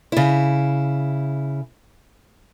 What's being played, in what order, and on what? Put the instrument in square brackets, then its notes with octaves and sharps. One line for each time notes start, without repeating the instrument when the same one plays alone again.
[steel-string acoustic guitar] C#3 E4